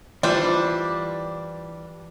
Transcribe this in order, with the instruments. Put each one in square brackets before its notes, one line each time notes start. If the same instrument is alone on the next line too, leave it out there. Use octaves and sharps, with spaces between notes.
[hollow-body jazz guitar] E3 F4 [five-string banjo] G3 D4 C5